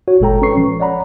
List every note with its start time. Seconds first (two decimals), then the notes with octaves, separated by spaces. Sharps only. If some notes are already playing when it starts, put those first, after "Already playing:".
0.08 F#4 C#5
0.20 G1 A#2 G#3 A4 G5 A#5
0.42 C#4 A4 B4 C#5 C#6 C7
0.57 F3
0.80 C#5 D5 F#5 A#5 B5